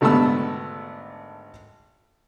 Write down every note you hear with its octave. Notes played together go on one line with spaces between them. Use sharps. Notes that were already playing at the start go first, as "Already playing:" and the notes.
G#1 D3 A3 B3 A5 E6